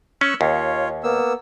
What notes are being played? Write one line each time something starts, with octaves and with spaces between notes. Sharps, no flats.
C#4 C#6 E6 F#6
D#2 F4 C#5
A#3 B3 E6